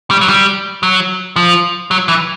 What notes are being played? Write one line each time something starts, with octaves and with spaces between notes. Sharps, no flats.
G3
F#3
G3
F#3
F3
F#3
E3